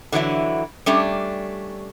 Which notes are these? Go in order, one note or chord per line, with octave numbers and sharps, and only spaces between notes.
D3 E3 F#3 A3 E4
G3 A3 C#4 D4 G4